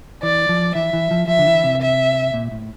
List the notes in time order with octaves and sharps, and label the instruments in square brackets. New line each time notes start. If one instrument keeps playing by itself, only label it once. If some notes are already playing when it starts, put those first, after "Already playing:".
[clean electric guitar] E3 [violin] D5
[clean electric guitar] F3
[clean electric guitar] E3 [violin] E5
[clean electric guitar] E3
F3
[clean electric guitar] F3 [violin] E5
[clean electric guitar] D3
E3
C3
[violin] E5
[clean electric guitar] A#2
A2